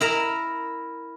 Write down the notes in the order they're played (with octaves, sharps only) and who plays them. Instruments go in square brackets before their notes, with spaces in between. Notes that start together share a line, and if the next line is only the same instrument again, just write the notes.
[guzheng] E4 A#4 E5 A#5